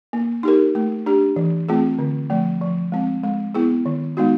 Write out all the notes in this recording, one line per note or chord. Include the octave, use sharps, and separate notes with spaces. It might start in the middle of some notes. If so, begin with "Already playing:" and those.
A#3
D#4 G4 A#4
A3
D4 G4
E3
A3 C4 F4 G#4
D3
F3 A3
F3
G#3 C4
G#3
B3 E4 G#4
D#3
G#3 B3 D#4 F#4